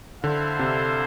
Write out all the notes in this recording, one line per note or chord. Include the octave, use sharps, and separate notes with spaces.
D3 E4 A4 C5 F5
C3